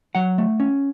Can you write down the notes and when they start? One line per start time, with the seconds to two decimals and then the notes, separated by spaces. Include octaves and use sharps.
0.15 F#3 F#5
0.38 A3
0.60 C#4